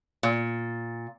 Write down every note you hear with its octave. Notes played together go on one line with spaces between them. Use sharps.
A#2